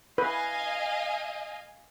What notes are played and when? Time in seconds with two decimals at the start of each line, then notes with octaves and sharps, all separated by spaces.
0.18 B4 D#5 F5 G#5